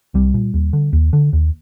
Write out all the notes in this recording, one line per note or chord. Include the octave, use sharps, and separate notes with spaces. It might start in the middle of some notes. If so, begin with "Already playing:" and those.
C2 G3
A#2
D#2
D3
D#2
D3
D#2